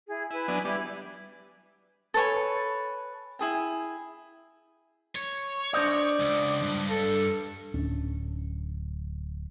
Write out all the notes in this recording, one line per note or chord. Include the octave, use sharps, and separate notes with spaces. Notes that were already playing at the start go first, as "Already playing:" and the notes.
E4 G#4
E4 B4 G#5
F#3 B3 D4
G3 E4 D5
A4 B4 C#5 G#5
E4 G#4 G5
C#5
D4 C5 D5 D#5
C#2
G2
A4
D1 C#4 D4